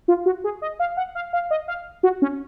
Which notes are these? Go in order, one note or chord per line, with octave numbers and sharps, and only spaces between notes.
F4
F#4
G#4
D#5
F5
F#5
F5
F5
D#5
F5
F#4
C#4